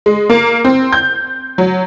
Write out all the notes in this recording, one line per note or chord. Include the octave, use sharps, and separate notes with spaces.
G#3
A#3
C4
G6
F#3